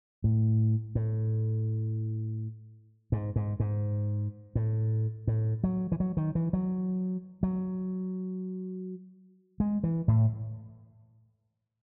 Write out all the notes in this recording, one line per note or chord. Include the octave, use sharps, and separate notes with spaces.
A2
A2
G#2
G#2
G#2
A2
A2
F#3
E3
F#3
D#3
E3
F#3
F#3
G#3
E3
A2